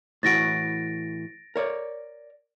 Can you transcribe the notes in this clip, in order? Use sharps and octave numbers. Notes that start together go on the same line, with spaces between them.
A2 E3 F#4 A6 A#6 D7
A#4 C#5 D5